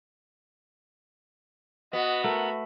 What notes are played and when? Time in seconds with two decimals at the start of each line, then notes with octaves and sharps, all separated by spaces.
1.93 B3 F#4 D#5
2.24 A3 A#4